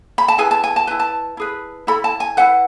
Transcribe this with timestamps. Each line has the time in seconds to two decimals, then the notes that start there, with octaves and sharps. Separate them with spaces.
0.18 B5
0.28 A5
0.38 E4 G#4 B4 G#5
0.51 A5
0.64 G#5
0.76 A5
0.87 E4 B4 G#5
0.99 A5
1.37 E4 G#4 B4
1.87 E4 A4 B5
2.04 A5
2.20 G#5
2.37 E4 B4 F#5